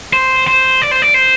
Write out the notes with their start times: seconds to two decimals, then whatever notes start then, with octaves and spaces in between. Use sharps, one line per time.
0.13 C5
0.47 C5
0.82 D5
0.91 C5
1.02 D5
1.14 C5